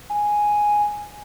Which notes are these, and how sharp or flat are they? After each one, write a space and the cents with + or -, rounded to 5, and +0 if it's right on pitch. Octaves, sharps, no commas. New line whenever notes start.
G#5 +0